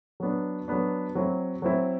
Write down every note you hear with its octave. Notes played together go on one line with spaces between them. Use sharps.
F#3 B3 D4
F#3 B3 D4
F#3 C4 E4
F#3 C4 E4